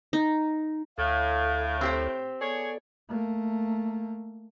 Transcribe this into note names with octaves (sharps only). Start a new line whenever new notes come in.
D#4
D2 A2 A4 F5
C4 G4 C5
B3 G#4 A4 C#5 D5
A3 A#3